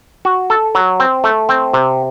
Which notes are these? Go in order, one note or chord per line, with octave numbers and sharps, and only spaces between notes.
F#4
A4
F#3
C4
A3
C4
C3